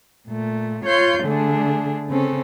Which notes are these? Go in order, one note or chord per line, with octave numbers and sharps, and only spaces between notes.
A#2 A3
F4 C#5 C6 G6
D3 A3 D4 G#4
C#3 C4 C#4 A4